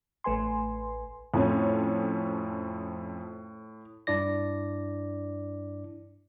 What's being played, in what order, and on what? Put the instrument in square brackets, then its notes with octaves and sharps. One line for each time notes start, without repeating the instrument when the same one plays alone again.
[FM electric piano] A1 A3 B4 G#5 C6
[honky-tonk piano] F2 C#4 [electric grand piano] A2
[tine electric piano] G2 D4 E4 D5 A#6